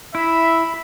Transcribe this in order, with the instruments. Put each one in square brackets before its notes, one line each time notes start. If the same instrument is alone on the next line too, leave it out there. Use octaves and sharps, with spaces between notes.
[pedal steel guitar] E4 [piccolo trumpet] E5 [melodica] B5